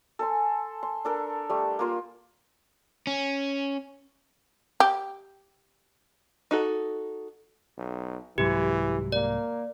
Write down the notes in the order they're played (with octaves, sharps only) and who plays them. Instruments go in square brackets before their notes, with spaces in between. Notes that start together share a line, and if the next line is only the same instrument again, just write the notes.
[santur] A4 G#5 C6
C6
D4 A4 A#4
G3 A3
A#3 F4 C6
[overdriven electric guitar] C#4
[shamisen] G4
[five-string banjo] D#4 F#4 A4
[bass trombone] B1
[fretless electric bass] C2 G#2 F#3 [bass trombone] E3 [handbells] G4
[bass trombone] A#3 [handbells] D5